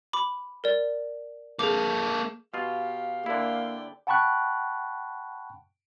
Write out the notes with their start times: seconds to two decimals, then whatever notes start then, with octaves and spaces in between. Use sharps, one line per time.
0.13 B5 D6
0.64 A#4 D5
1.59 A#3 G#4 A4 D6
2.54 B2 F4 G4 F5
3.26 D3 A#3 E4 D5 G5
4.07 F#5 G5 A5 B5 C#6 F#6